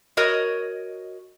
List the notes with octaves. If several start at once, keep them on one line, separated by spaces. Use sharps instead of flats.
F#4 A#4 C#5 D#5